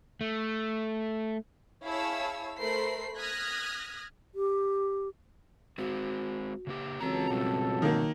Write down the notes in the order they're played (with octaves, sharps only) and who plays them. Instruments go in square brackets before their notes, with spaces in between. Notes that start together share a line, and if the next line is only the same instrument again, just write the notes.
[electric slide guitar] A3
[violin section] E4 G#4 C#5 F5 A5 E6
A3 A4 A#4 C5 B5 C7
D#6 F6 F#6 G#6 A#6 B6
[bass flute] G4
[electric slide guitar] G#3 C4 [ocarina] F#4
[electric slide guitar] C#3 A#3 G4
[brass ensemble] C#2 F#3 A4 [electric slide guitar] E3 A#5 [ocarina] C4
[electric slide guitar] B2 F3 G3
[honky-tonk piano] D#3 A#3